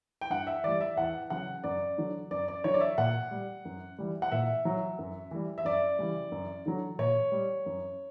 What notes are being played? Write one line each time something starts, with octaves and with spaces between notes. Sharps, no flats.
G5
G2 F#5
E5
E3 G3 D5
E5
E2 F#5
C#3 F#3 F#5
F#2 D5
D3 F#3
F#2 D5
D5
D3 F#3 C#5
D5
E5
A#2 F#5
G3
F#2
E3 G3
F#5
A#2 E5
F#3
F#2
E3 G3
E5
F#2 D5
C#3 E3 G3
F#2
D3 F#3
A#2 C#5
G3
F#2